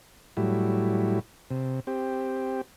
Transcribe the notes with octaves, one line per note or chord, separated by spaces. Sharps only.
A2 F#3 G3 E4
C3
C4 G4